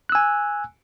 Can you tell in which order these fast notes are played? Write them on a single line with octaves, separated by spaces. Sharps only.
F#6 E6 G#5